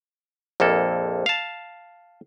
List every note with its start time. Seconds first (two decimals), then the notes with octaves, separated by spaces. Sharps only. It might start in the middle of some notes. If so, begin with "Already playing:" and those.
0.60 A#1 F2 A#3 A4
1.26 F5 A5